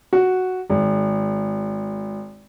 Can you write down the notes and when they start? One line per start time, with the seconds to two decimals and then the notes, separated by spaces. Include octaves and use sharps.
0.13 F#4
0.70 G#1